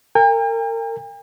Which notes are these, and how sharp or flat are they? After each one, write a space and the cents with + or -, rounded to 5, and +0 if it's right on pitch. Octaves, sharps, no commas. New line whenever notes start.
A#4 -35 G5 +45